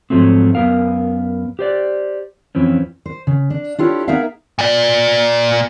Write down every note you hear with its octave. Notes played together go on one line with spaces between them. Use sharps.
G#2 F3 F#3 A3 C4
F#2 D#3 B3 A#4 F5
G4 C5 D5
F2 E3 C4 C#4
C5
C#3
D4
D4 E4 F4 G4 A4 C#5
B3 D#4 G#4 A#4 E5 F5
A#2 D5